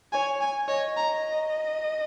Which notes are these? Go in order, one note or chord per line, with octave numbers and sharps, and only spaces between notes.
C#5 G#5
G#5
C#5 D#5
A#5